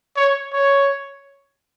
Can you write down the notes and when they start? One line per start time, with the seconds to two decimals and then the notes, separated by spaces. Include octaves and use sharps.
0.16 C#5
0.53 C#5